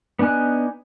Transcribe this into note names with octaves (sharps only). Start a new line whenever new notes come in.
B3 D4 D#4 G#5 F#6